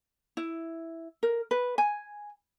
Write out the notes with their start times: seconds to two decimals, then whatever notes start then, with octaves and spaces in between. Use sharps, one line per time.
0.37 E4
1.23 A#4
1.51 B4
1.78 G#5